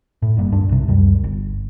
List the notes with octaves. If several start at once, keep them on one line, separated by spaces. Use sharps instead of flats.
A2
F#1 G2 A#3
D1 G2 D4
B1 C3
C#2 F#2 G3
G1